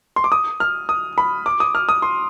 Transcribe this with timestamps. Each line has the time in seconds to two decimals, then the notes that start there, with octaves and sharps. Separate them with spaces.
0.16 C6
0.24 D6
0.32 D#6
0.60 F6
0.89 D#6
1.18 B5
1.46 D6
1.60 D#6
1.75 F6
1.89 D#6
2.02 C6